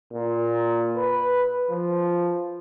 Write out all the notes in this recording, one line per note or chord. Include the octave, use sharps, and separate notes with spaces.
A#2
B4
F3